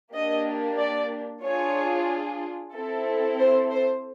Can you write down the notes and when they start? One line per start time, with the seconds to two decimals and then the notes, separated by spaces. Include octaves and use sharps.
0.13 A#3 D4 G4 D#5
0.78 D5
1.43 D4 F4 G#4 C#5
2.74 C4 E4 A4
3.40 C5
3.72 C5